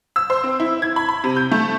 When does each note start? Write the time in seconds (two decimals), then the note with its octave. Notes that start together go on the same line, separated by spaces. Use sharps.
0.16 E6
0.30 C5
0.44 C4
0.60 E4
0.82 G#6
0.96 B5
1.09 B5
1.24 C3
1.37 G6
1.52 A3